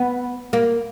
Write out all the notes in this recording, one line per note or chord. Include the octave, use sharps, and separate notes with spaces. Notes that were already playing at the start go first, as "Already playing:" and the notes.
Already playing: B3
A#3